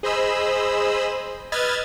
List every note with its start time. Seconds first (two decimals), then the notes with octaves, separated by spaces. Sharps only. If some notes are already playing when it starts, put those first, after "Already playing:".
0.03 G#4 C5 D#5 B5 E6
1.52 B4 D#5 E6 F6 G#6 A6